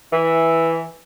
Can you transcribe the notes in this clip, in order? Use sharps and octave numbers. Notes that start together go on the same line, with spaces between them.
E3